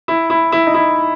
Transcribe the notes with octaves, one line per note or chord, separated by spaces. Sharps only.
E4
E4
E4
D#4
E4